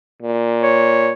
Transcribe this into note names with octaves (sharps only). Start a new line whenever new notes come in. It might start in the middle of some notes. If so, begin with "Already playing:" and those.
A#2
C#5